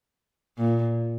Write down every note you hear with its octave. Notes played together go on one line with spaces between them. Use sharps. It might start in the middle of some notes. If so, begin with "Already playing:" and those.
A#2